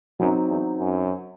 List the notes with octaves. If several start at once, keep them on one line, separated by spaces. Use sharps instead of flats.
F#2 F#3 C4 D#4
E2
F#2